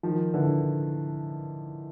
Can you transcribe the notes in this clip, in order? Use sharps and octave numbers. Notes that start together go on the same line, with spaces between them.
D#3 F3
D3 E3